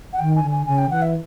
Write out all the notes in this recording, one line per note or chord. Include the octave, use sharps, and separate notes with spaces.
F#5
D#3 G5
G#5
D3
G#5
C#3 G#5
G5
E3 F#5
E5